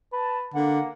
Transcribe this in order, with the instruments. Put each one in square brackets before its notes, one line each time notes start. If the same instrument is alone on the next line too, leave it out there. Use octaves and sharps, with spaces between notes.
[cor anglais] B4 [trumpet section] A5
[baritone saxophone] D3 [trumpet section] A#3 [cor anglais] F#5